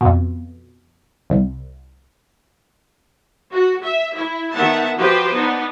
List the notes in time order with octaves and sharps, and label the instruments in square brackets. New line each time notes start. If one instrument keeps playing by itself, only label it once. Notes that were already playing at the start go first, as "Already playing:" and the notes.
[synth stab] F2 B2
C2
[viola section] F#4
E5
E4
D#3 B3 E5 F#5 A5
F3 F#4 G4 B4 C5
B3 D4 D#4